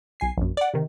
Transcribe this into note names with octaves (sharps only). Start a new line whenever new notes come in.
B1 G#5 C7
A#1 F#2
D5 F#5
C3 D#3